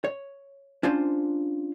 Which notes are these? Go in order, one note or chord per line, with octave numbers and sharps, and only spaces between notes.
C#5
C#4 D4 F4 C5